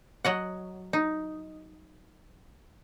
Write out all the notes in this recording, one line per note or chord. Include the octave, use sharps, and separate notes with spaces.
F#3 D#5 F#5
D#4